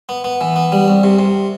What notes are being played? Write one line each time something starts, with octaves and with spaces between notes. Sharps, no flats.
B3
B3
E3
B3
G3
C2
C3
C3